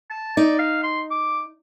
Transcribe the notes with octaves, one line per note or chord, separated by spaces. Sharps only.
A5
D#4 D5
F5
C6
D6